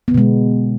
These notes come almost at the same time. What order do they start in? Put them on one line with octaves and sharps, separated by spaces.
B3 D3 B2 G#3